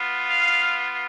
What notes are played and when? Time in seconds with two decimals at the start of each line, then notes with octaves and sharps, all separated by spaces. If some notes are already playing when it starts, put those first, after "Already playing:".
Already playing: B3 F4
0.27 F5